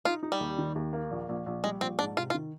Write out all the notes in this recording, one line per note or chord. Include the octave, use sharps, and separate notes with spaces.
D#4 F4
D#4
G3
D#2
D#3
D#2
A#3
A#1
A#1
A#1
G3 G#3
A#1 C4
G#2 D4
C3 F4
F4
D#3